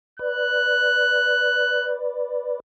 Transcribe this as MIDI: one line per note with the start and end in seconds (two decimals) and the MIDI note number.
0.19 2.60 71
0.19 2.60 74
0.19 1.97 90